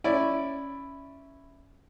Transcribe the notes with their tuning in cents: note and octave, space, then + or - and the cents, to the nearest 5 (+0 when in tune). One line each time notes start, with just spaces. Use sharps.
C#4 +0 E4 +0 D5 +0